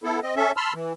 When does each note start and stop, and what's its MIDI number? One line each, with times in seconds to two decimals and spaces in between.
0.04 0.20 59
0.04 0.20 64
0.04 0.20 69
0.22 0.35 60
0.22 0.35 75
0.36 0.52 61
0.36 0.52 69
0.36 0.52 76
0.57 0.73 81
0.57 0.73 83
0.57 0.73 84
0.57 0.73 88
0.57 0.73 89
0.74 0.93 52